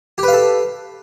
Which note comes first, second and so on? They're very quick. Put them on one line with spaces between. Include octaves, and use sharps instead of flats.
G4 B4 F5 A4